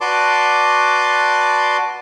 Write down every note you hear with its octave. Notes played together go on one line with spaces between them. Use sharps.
F#4 B4 D5 A5 C6 D6